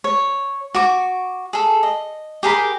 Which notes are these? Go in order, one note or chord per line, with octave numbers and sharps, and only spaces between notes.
C#5
F#4 C#6 D6
G#4 A4
D#5
G4 G#4 A#4 B5